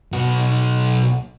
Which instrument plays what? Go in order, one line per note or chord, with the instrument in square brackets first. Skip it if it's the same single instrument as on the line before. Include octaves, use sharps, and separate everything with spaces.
[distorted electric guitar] B1 F#4